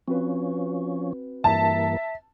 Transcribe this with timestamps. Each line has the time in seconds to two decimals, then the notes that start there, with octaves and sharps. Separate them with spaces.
0.08 F3 C4 C#4 F#4 B4
1.44 G2 E3 A#3 E5 A5